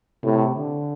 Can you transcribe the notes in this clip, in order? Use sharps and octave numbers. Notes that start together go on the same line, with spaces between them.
A2 C3
D3